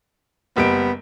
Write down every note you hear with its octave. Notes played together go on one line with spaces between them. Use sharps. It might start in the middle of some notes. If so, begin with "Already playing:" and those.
F#1 G3 B3 D7